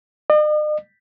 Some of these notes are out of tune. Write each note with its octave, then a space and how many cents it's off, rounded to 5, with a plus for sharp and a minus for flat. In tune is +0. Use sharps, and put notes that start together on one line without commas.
D#5 -45